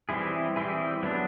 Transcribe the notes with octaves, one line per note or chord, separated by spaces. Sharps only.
E3 G3 C4 E4 G#4
E3 G3 C4 E4 G#4
F#3 B3 D4